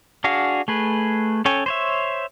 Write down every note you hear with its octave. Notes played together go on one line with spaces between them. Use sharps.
D4 F#4 G#4 F5
A3 G#4 B4
C#4 A4 C#5 G5 G#5
C5 C#5 E5